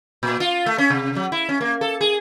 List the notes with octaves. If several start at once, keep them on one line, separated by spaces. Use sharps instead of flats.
A#2
F4
A3
C#4
C3
F#3
E4
C#4
A#3
A4
G#4